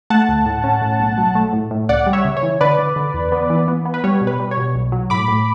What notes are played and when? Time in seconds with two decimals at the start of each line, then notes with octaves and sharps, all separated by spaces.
0.10 A3 F#5 A5
0.29 D2
0.46 A2
0.64 C#4
0.82 A2
1.00 B1
1.18 F#3
1.35 A3
1.53 A2
1.71 A2
1.89 C#2 D5 F#5
2.06 G3
2.13 C#5 E5
2.25 C#3
2.37 C#5
2.43 E3
2.61 D3 B4 D5
2.78 D3
2.96 D3
3.14 E2
3.32 B3
3.50 E3
3.68 B3
3.85 B3
3.94 B4
4.04 G3 C#5
4.21 B2
4.27 B4
4.40 G3
4.51 C#5
4.57 B2
4.75 B1
4.92 F#3
5.10 A2 B5 D6
5.28 A2